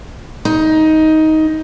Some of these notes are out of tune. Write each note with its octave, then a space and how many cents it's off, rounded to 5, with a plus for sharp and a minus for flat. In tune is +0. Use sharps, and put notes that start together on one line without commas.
D#4 +15